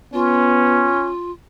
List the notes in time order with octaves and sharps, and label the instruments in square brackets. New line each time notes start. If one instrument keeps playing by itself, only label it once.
[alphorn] B3 [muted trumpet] C#4 [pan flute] F4